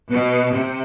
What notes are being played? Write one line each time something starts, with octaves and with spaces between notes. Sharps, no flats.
B2
C3